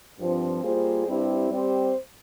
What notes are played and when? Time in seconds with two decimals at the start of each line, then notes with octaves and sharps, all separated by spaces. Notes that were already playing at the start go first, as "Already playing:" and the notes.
0.19 G2 F3 C4
0.63 G3 A#3 F4 G#4 C5
1.07 G2 G3 C4 E4 G4
1.51 G3 C4 G4 C5